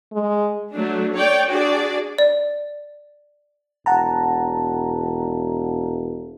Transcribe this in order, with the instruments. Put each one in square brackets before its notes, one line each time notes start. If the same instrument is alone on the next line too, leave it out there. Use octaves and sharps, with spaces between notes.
[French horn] G#3
[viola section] F#3 A3 D4
C#5 D5 G5
D4 F#4 G#4 D5
[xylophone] D5
[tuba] E1 [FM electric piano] F#5 A5 A#5